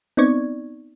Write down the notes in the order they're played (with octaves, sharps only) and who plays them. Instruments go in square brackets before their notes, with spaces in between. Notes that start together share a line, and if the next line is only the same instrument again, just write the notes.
[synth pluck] B3 C4 D#4 D5 C#6 G#6